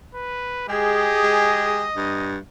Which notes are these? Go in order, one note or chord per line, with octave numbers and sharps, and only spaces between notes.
B4
G#3 G4 G#4 D#5
G#3
G2